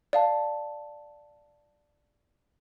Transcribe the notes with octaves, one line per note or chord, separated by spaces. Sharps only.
D5 F5 A5